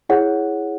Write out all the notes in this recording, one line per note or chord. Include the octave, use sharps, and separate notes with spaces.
E4 G#4 C#5 F#5